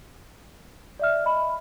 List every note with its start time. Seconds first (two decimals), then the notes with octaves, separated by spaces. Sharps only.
0.99 D5 E5 F6
1.24 D#5 B5